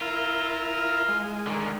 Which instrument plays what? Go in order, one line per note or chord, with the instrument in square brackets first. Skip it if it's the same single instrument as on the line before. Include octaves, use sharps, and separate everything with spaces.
[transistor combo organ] E4 A#4 [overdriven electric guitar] F4
[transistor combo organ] G#3
[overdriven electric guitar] D3 D#3